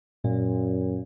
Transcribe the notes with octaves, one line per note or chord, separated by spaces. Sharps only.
F#2 A#2